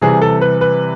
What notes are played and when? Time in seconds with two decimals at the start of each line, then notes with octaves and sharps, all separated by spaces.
0.02 C3 E3 G3 G#4
0.22 A4
0.41 B4
0.61 B4